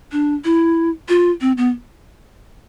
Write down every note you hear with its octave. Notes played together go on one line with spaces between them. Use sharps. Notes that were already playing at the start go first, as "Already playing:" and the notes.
D4
E4
F4
C4
B3